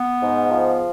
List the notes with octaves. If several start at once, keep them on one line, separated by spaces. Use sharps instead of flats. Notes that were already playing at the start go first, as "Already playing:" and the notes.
Already playing: B3
G#2
F3